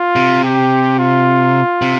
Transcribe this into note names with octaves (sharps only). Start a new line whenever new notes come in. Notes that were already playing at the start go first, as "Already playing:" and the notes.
Already playing: F4
C3
G4
F4
C3